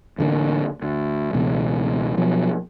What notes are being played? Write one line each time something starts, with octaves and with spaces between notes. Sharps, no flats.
A1 D3 F3 A#3
D2
C#2 B2 E3
B2 F3 F#3